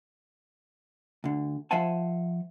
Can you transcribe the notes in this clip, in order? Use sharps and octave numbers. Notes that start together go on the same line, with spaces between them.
D2 D3
F3 C5 E5 F#5 G#5 A5